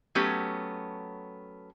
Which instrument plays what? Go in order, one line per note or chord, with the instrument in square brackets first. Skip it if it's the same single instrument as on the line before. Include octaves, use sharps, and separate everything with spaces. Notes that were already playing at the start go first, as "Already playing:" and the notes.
[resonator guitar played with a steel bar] F#3 A3 B3 C#4 G4